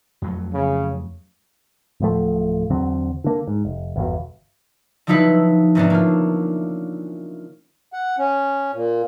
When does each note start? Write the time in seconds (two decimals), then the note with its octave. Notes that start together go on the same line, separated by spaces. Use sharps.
0.22 F2 F#3 A3
0.54 C#3
2.00 D1 A2 F3 A3
2.70 E2 D3 F#3 C4
3.24 D3 A#3
3.48 G#2
3.65 F1
3.96 G1 E2 B2
5.07 D3 F3 F#3 D#4 E4 B4
5.75 G#2 C3 E3 B3 C#4 D4
5.90 A#3 F4
7.93 F#5
8.18 C#4
8.74 A#2